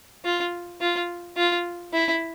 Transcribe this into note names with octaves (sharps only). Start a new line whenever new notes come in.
F4
F4
F4
E4